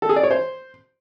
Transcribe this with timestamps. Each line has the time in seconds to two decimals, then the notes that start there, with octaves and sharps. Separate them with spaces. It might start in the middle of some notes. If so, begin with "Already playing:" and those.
0.02 A4
0.09 G#4
0.16 D5
0.23 C#5
0.31 C5